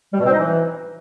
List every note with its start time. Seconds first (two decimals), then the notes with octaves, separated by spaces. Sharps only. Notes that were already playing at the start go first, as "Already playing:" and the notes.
0.13 G3
0.20 B2
0.26 C4
0.32 D#4
0.39 E3